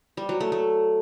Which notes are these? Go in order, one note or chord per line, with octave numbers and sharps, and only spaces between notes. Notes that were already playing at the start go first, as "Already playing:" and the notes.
G3
F#3
A3
A3